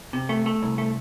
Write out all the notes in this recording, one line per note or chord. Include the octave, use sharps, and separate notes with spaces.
C3
A3
A3
C2
A3